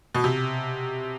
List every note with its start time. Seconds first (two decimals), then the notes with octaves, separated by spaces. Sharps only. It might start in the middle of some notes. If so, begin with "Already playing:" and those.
0.15 B2
0.24 C3